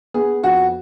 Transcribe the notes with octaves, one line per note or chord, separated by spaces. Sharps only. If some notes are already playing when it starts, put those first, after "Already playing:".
B3 G#4
F2 F#4